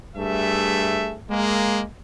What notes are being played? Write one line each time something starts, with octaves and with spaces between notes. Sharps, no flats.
G2 A3 G#4 E5
G#3 A#3